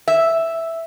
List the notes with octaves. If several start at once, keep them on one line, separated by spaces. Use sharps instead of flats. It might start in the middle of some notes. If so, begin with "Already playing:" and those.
E5